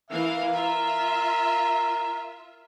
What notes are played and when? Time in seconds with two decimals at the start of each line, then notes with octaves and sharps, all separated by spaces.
0.10 E3 A#4 E5 F5
0.54 F4 A#4 E5